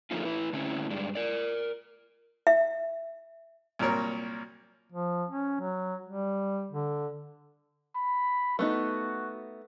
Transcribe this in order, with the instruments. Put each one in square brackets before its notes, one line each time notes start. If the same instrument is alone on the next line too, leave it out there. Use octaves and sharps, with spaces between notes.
[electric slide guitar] D3 F3 A3 A#3 D#4 F4
A2 E4 B4
D3 A3 C4 C#4 E4
G2 G#3 D4
A#4 D5
[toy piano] E5
[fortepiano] C2 A#2 F#3 A#4 C#5
[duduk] F3
C#4
F#3
G3
D3
[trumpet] B5
[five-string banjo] A3 B3 D#4 [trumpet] F#4